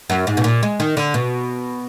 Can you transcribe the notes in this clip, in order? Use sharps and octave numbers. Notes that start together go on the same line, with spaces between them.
F#2
G#2
B2
A#2
G#3
D#3
D3
B2